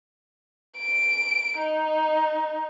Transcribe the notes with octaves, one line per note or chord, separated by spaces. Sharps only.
D7
D#4